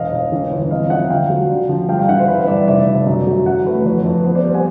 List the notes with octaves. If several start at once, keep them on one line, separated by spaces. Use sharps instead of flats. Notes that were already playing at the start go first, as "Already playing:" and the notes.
Already playing: E1 D#5 F5
E1
E3
G1
C4 D#5 F5
F3 E5 F#5
D3 F5 G5
F#3
D3
F3
G2 F5 G5
F5 G5
E3 E5 F#5
C5
G2 B4
G2 D5 E5
F1 D5 E5
C#3
F#2
F#3
E3 E5 F#5
A3 B4
F2 B4 C#5
F2 B4
B3 C5
C5 D5
G3
F#5 G#5